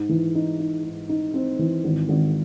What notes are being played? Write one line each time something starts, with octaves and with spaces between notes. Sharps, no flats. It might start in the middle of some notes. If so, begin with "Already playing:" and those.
Already playing: G#2
E3
D#4
D#4
G#2
D#4
C4
E3
G#1
G#1